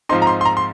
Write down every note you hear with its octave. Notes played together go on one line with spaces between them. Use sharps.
G#2 F3 C4 D#4 C6
A#5
C6
C6
A#5
C6